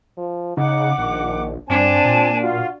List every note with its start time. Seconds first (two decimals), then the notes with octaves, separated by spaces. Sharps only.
0.18 F3
0.57 C#3 D#4 F#5 D6
0.98 A#1 D#3
1.69 G2 C4 D4 G#5 A5
2.05 A#2
2.42 F4 F#4